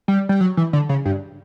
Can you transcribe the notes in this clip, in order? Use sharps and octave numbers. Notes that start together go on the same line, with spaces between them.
G3
G3
F#3
E3
D3
C#3
G2